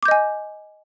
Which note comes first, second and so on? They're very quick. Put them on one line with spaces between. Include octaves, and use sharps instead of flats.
D6 G6 D#5 G#5